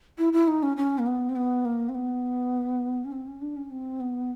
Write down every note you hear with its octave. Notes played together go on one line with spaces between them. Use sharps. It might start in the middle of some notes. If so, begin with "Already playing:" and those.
E4
E4
D#4
C#4
C#4
A#3
B3
C4
B3
A#3
C4
B3
C#4
C4
C#4
D4
C#4
C4
B3